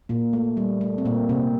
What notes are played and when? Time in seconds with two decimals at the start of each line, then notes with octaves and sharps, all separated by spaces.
0.09 A#2 A#3
0.33 A3
0.57 G3
0.81 A3
0.98 C4
1.05 A#2 A#3
1.29 C3 C4